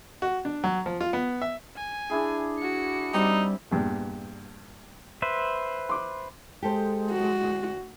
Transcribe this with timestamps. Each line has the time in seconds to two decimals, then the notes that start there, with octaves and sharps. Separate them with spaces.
0.22 F#4
0.45 D4
0.64 F#3
0.86 F3
1.01 F4
1.13 B3
1.42 E5
1.76 G#5
2.10 D4 E4 G#4
2.59 F#4 C#7
3.14 G3 C4 D#4 G4
3.71 E2 G2 A#2
5.22 B4 C5 E5
5.89 C6 D6
6.63 G#3 G4 A4 C5
7.11 F#4
7.43 D2